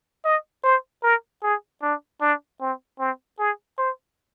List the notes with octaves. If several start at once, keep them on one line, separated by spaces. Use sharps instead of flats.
D#5
C5
A#4
G#4
D4
D4
C4
C4
G#4
C5